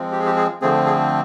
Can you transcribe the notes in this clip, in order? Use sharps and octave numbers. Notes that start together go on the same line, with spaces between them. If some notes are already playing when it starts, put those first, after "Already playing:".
Already playing: F3 G#3 C4
G4
G#4
G4
G#4
D3 F3 A3 C4 G#4
G#4